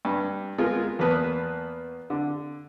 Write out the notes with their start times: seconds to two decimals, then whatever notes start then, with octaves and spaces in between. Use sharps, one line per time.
0.05 G2
0.58 G#3 B3 F4 A#4
0.99 E2 A#3 B3 B4 A5 D#6
2.10 D3